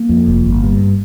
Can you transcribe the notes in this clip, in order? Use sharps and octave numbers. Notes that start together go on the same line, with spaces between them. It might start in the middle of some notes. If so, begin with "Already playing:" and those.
Already playing: A#3
F2
F1
G1
G2